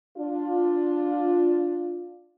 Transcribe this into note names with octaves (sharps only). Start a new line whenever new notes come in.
D4 F4